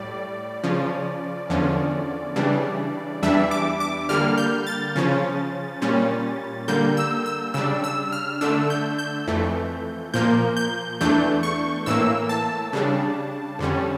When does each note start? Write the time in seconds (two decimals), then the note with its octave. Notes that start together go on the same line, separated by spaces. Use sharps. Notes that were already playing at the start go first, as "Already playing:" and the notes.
Already playing: A2 G3 D5
0.64 C#3 F3 C#4
1.50 E2 D3 F3 C#4
2.36 C#3 E3 G3 D4
3.22 E2 E3 G3 D4 E5
3.51 D6
3.80 D6
4.09 D3 G3 A#3 F6
4.38 G6
4.67 A6
4.96 C#3 F3 C#4
5.82 A#2 G3 C#4
6.68 D3 G3 A#3 G6
6.97 E6
7.26 E6
7.54 C#3 G3 D4 E6
7.84 E6
8.12 F6
8.41 D3 A3 D4 E6
8.70 G6
8.99 G6
9.27 F2 E3 A3
10.14 A#2 F3 A#3 G6
10.57 G6
11.01 E2 E3 A3 D4 G6
11.43 C#6
11.86 A2 E3 A#3 E6
12.29 A5
12.73 C#3 G3 D4
13.59 F2 D3 G3 C#4